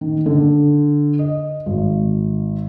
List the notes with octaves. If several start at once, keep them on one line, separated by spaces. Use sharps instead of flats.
D#3
D3
D#5
G#1